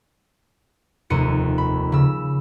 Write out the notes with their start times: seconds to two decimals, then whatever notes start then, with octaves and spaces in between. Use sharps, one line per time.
1.10 F1 D#2 C#7 D#7
1.58 B5
1.92 C#3 E6